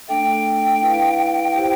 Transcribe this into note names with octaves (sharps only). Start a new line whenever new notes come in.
A3 D4 A4 E5 G5
E4 B4 F5
E4 G4 C5